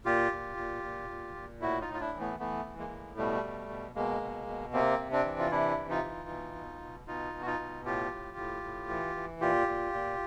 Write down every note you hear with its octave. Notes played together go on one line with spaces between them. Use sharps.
A#2 F4 G4
A#2
A#2
A#2
A#2
A#2
A2 E4 F#4
D#4 F4
A2
F4
D4 E4
E3
A3 B3
E3 A3 B3
E3
G#3 A#3
A2
B2 G3 A3
B2
B2
B2 G#3 A#3
B2
B2
C3 A#3 C4
C3
C4 D4
E3
F4
C3 D4 E4
E3
D#4 F4
E3
B2
B2
B2
B2 D#4 F4
B2
F#4
D#4 F4
B2
A2 F4 G4
A2
A2
A2
E3
E3
A#2 F4 G4
A#2
A#2